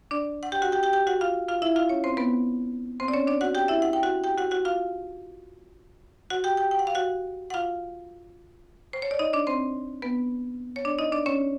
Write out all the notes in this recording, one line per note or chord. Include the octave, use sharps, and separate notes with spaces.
D4 D5
F#5
G4 G5
F#4 F#5
G4 G5
G4 G5
G4 G5
F#4 F#5
F4 F5
F4 F5
E4 E5
F4 F5
C#4 C#5
C4 C5
B3 B4
C4 C5
D5
C#4 C#5
D4 D5
F#4 F#5
G4 G5
E4 E5
F#5
G5
F#4 F#5
G4 G5
F#4 F#5
F#4 F#5
F4 F5
F#4 F#5
G4 G5
G4 G5
G5
F#5
F5
F#4 F#5
F#5
F4 F5
C5
C#5
D5
D#4 D#5
D4 D5
C4 C5
B3 B4
C#5
D4 D5
D#4 D#5
D4 D5
C#4 C#5